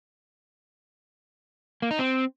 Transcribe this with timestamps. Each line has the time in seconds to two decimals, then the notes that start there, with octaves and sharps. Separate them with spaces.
1.82 A#3
1.91 D#4
1.99 C4